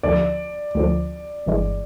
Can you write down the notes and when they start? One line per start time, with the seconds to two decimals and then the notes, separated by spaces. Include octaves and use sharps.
0.03 D2 D3 F3 D5
0.75 D2 D3 F3
1.46 G1 G2 E3 G#3